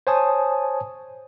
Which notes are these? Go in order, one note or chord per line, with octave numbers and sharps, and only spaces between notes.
C5 C#5 G#5 A5 D#6